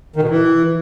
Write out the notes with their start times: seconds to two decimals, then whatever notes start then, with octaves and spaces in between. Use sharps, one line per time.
0.16 D#3
0.23 B2
0.29 E3